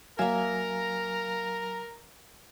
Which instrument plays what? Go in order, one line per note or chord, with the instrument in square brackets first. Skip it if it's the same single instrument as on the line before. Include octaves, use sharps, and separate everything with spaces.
[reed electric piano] F#3 F5 G#5 [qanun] A#3 E5 [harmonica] A#4 [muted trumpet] A#5